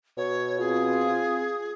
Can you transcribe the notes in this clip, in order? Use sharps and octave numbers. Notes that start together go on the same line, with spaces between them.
B2 C#5
C4 F4 G#4